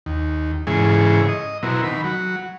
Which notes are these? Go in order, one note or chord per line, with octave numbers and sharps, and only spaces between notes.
D#2
G#2 C#3 E3 G#4
D#5
B2 F#3 C4 E4 A#4
D#3 B5
F#3